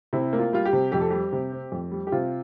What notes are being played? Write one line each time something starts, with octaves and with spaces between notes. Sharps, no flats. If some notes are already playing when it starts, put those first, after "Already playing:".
C3 E4
A#3
F4
G3 F4
G4
C3
F2 G4
A4
G3 G4
C3
C4
F2
G3
G4
C3 F4